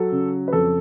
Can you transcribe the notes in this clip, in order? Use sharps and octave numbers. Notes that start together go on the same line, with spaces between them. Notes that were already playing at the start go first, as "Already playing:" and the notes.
Already playing: F#3 A4
C#3
B4
F2 A4